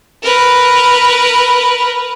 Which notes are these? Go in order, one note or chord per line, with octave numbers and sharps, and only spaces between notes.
A#4 B4